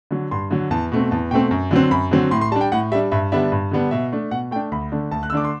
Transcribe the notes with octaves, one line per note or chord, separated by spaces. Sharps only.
D3 F#3
G2 C6
D3 F#3
E2 A5
B2 A3 C4
E2 A5
B2 A3 C4 G5
F#2
D3 F#3 C4
F#2 B5
D3 F#3 C4
A2 C6
C6
G3 D4 A5
G5
A2 F#5
G3 D4 E5
G2 E5
D3 G3 B3 D4 E5
G2
D3 G3 B3 D4
B2 E5
A3 D4
B2 F#5
A3 D4 G5
D2 B5
D3 A3 D4
D2 A5
F#6
E6
D3 A3 D4 D6
C6